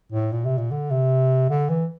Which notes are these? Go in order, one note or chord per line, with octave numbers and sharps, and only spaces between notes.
A2
A#2
C3
A#2
D3
C3
D3
E3